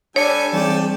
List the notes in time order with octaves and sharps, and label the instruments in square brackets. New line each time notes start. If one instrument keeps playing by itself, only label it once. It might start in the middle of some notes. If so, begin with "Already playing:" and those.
[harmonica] G3 A4 G#5 [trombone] D4 [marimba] C#5
[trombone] G#2 [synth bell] E3 G3 C4 [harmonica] D5 G5 A5